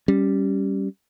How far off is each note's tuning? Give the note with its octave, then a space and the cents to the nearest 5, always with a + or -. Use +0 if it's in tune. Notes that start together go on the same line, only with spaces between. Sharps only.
G3 +0 C#4 +0